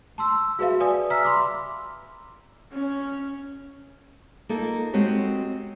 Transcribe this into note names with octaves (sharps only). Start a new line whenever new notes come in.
A5 C6 E6
F#4 G#4 B4 E5 F5
B4 D5 G#5 D#6
E5 A#5 E6 F6 B6
B5 C6 D6
C#4
A#3 D#4 F4 A4
G#3 C4 F#4 G4 C#5